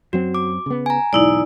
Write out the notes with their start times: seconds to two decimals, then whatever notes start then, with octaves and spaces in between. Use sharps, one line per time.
0.13 F#2 F#3 C4 F#4
0.35 D6
0.66 C#3 B3
0.86 G#5 A#5
1.13 E1 B1 G#2 D#4 E4 D5